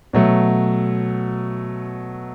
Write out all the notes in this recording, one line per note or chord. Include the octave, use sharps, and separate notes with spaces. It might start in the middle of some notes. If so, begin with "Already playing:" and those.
B2 F#3 A3